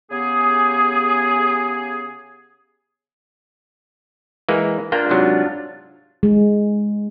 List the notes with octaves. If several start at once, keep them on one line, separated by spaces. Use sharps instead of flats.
C#3 B3 G4 G#4
E3 G#3 A#3
A#3 D4 F4 G5
G#2 C3 F#3
G#3